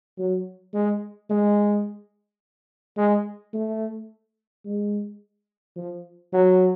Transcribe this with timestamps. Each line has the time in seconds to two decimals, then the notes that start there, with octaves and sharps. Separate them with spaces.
0.18 F#3
0.74 G#3
1.30 G#3
2.97 G#3
3.53 A3
4.66 G#3
5.76 F3
6.33 F#3